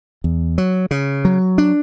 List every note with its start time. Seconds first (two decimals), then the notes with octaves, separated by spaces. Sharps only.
0.24 E2
0.58 F#3
0.91 C#3
1.25 F#3
1.58 D4